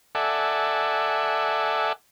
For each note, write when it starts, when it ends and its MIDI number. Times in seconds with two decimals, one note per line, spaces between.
0.15 1.93 69
0.15 1.93 74
0.15 1.93 76
0.15 1.93 78
0.15 1.93 80